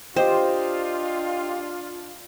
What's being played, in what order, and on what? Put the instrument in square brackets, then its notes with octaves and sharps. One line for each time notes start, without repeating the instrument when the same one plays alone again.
[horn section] D4 F4 [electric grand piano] G4 D#5 G5 [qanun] C5